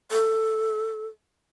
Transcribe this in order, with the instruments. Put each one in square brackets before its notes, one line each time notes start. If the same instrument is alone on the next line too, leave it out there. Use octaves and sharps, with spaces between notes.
[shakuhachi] A4